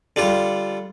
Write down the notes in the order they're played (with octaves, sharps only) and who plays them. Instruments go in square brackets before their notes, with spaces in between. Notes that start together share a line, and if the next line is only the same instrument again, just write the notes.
[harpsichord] D3 G3 F4